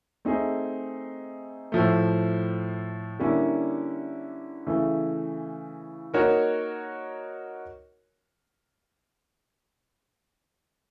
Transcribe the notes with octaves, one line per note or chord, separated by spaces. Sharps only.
A3 C4 D#4 G#4
A2 F3 A3
D3 G3 A#3 C#4 E4
C#3 E3 A3
A#3 D#4 F#4 A#4 C#5